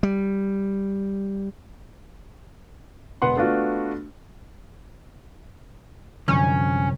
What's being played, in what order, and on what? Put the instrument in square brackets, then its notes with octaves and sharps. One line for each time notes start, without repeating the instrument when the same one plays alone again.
[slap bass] G3
[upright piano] E1 B3 F#5 C6
A3 B3 D4 F4 F#4
[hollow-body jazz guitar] C2 [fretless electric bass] F#2 D3 F3 [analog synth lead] C#4